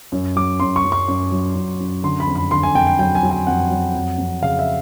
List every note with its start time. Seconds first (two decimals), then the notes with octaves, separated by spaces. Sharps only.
0.12 F#2
0.36 F#3 D6
0.60 F#2 C6
0.76 C#6
0.84 F#2
0.92 C#6
1.08 F#2
1.32 F#3
1.55 F#2
1.80 F#2
2.03 D3 C6
2.20 B5
2.27 F2
2.35 B5
2.51 D3 C6
2.63 G#5
2.75 F2 G5
2.87 G5
2.99 F#3 G5
3.15 G#5
3.23 F#3
3.31 G#5
3.47 F2 F#5
3.70 F#3
3.95 F2
4.18 F2
4.42 C#3 F5
4.59 E5